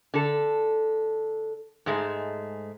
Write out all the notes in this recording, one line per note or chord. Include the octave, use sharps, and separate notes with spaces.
D3 A4
G#2 G#3 A3